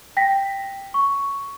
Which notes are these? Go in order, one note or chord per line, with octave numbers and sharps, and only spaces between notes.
G5 A#6 B6
C#6